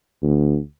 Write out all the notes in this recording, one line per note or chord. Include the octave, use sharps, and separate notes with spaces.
D2